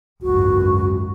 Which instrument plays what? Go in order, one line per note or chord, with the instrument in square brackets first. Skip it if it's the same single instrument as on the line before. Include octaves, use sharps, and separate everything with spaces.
[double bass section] G#1 C#2 F#2 [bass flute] F#4